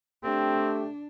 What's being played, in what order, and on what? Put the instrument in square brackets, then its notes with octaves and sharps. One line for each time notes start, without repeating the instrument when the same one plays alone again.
[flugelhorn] A3 [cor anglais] C4 [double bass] D4 [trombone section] G4